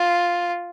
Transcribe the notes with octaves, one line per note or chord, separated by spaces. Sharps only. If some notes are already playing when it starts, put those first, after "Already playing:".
Already playing: F4